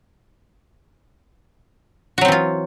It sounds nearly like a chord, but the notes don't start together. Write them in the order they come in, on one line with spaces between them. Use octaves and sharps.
F#4 F#3 C4 E3 F4